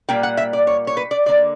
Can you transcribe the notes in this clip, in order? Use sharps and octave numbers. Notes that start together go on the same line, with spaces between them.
A#2 G3 A#3 G5
F#5
E5
D5
C#5
C#5
B4
D5
D3 A#3 D5